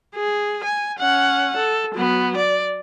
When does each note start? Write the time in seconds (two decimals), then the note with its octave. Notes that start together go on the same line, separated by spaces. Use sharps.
0.16 G#4
0.64 G#5
0.99 C#4 F#5
1.57 A4
1.95 F#3 B3
2.37 D5